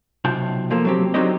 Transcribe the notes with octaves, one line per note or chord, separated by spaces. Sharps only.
B1 C3 F4 G5 A5
F3 A#3 F4 A4
F#3 C4 G4
D3 F#3 C4 D#4 G4 D#5